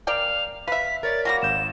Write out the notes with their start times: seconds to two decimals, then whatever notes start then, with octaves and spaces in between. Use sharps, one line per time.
0.07 A#4 D5 F5 G5
0.68 B4 E5 F5 B6
1.03 A#4 C#5 D5 A6
1.25 F#3 G3 A#3 A#6
1.42 G#1 G6 E7